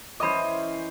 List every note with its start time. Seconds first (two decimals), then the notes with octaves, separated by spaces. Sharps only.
0.20 E3 C#4 C5 D#5 B5 D6